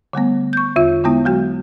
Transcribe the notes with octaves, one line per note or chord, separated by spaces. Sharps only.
D3 G3 A3 B3
C#6 G6
E2 D3 F4 E5
D3 G#3 B3 E4
F#3 G#3 F#4